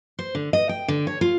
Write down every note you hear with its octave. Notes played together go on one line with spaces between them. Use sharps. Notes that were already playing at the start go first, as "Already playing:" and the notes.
C5
D3
D#5
G5
D3
C#5
F4